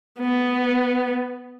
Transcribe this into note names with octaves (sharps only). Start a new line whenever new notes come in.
B3